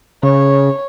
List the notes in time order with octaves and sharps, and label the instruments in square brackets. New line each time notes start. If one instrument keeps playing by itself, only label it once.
[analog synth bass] C#3 [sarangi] C#5